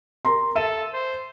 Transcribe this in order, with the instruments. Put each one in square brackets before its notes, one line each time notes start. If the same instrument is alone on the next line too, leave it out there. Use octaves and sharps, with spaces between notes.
[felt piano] A#4 A#5 C6
[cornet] A4 [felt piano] E5 D#7 E7
[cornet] C5